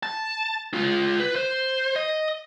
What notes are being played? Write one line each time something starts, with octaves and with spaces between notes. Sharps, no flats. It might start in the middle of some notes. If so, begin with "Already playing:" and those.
A5
G#3 F4
B4
C5
D#5